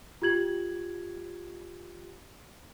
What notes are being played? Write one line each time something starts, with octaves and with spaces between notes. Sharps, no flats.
F4 G4 G#6 F#7